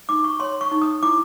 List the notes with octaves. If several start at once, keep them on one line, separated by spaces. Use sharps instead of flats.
D#4 D6
C#6
C#5 C6
C#6
D#4
D#6
E4 D6